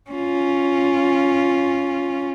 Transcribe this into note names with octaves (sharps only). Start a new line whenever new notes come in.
C#4 F4